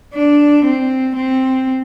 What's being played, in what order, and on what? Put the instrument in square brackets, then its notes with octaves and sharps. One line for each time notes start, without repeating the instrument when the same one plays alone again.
[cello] D4
C4
C4